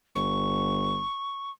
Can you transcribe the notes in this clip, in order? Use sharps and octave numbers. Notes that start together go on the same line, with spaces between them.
G1 C#6